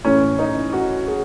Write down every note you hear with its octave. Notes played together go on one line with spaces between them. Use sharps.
A2 E3 C#4
D#4
F#4
G#4